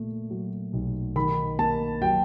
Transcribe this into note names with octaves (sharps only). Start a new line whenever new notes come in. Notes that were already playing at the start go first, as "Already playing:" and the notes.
Already playing: A#2 A3
F#3
B1
D#3 B5
A#3 A5
F#3 G5